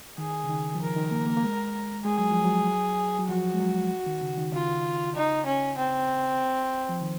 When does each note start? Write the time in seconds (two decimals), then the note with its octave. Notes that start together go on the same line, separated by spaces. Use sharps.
0.18 D#3 G#4
0.44 C#3
0.49 D#3
0.75 F3
0.81 D#3 A#4
0.96 D#3
1.11 A#3
1.27 A#3
1.37 A#3
1.43 G#3
2.05 G#3 G#4
2.18 F#3
2.31 F3
2.44 F#3
3.19 F#3
3.29 F3 F#4
3.54 G#3
3.60 F#3
4.06 D#3
4.21 C#3
4.38 D#3
4.53 C#3 F4
5.15 D#4
5.46 C#4
5.77 C4
6.89 F3
7.01 D#3